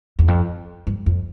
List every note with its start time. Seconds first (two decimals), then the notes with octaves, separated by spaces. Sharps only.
0.19 E2
0.28 F2
0.87 G2
1.06 F2